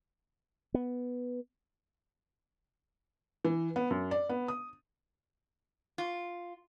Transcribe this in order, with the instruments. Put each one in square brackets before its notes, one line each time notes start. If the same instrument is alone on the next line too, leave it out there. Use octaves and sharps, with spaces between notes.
[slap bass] B3
[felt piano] E3
B3
F#2
D5
B3
D#6
[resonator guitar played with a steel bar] F4